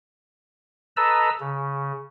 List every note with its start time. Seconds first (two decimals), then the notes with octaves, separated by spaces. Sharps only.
0.97 A4 B4 D#5 A5 A#5 E6
1.40 C#3